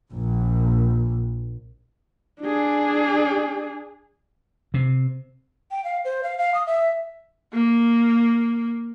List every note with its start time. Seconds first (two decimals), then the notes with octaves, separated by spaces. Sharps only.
0.11 A#1
2.41 D4 G#4
4.74 C3
5.71 G5
5.84 F5
6.05 C5
6.23 F5
6.38 F5
6.54 D#6
6.67 E5
7.53 A#3